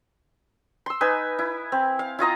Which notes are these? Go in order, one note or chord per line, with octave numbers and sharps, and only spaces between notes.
C6 E6
D#4 B4 G#5 E6
E4
C4
F5
E4 F4 D#5 A#5